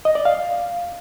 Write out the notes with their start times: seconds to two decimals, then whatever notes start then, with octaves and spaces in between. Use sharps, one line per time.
0.05 D#5
0.15 D5
0.25 F5